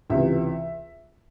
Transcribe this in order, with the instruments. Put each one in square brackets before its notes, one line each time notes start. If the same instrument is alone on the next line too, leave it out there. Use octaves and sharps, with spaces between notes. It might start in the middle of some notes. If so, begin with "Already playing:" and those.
[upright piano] C#2 C3 E3 E5